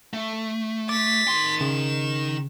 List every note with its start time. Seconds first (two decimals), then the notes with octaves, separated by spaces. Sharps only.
0.13 A3
0.89 D6 A6 B6
1.28 D#3 C6
1.61 C#3 E7